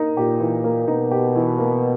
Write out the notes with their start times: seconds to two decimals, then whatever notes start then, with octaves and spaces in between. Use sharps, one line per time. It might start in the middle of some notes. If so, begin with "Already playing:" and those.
Already playing: A#3 D#4
0.17 A#2 G4
0.40 E3
0.64 A#3
0.88 B2 D#4
1.11 G4
1.36 E3
1.58 A#3